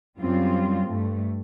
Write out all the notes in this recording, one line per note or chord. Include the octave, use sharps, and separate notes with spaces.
F#2 G3 C4 F4
G2 A3